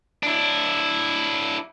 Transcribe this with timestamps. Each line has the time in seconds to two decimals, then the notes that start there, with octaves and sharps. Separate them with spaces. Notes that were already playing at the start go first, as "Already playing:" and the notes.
0.23 D4 E4